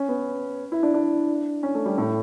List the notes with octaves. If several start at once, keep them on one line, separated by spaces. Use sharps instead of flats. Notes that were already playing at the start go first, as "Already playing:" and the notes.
Already playing: C#4
B3
E4
D4
D4
C#4
A3
G3
A2